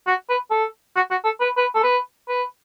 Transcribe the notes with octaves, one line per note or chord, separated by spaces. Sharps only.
F#4
B4
A4
F#4
F#4
A4
B4
B4
A4
B4
B4